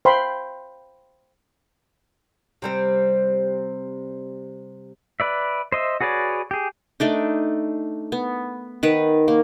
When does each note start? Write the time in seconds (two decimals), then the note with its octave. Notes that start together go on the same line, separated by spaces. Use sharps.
0.05 C5 F5 G5 B5 C6
2.62 C3 G3 C4
5.20 B4 D5 E5
5.72 C5 D#5 E5
6.01 F#4 G#4 B4 C#5 D5
6.51 G4 G#4
7.00 A3 D4 D#4
8.12 B3
8.83 D#3 B4 F#5
9.28 A#3